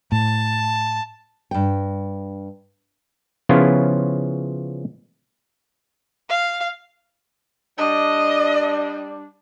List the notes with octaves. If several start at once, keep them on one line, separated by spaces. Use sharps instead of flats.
A2 A5
G2 G5
C#3 F3 B3 C#4 E4 F4
F5
G3 D4 D#5